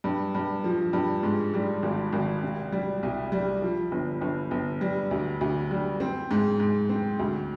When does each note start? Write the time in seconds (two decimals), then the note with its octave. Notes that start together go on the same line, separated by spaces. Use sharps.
0.04 G2
0.35 G2
0.64 F3
0.93 G2
1.23 G#2
1.54 G3
1.83 G#1
2.12 G#1
2.43 C3
2.72 G3
3.03 C2
3.32 G3
3.62 F3
3.91 G1
4.21 G1
4.51 G1
4.81 G3
5.11 D2
5.41 D2
5.71 G3
6.00 C4
6.31 G#2
6.60 G#2
6.89 C4
7.19 D2